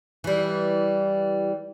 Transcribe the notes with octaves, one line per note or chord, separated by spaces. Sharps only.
E3 G3